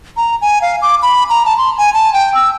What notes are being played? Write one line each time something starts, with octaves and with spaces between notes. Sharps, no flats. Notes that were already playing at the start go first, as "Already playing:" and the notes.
A#5
G#5
F5
D6
B5
A#5
A5
C6
G#5
A5
G5
E6